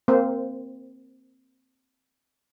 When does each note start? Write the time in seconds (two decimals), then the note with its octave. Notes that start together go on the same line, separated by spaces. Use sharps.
0.08 A#3 C4 C5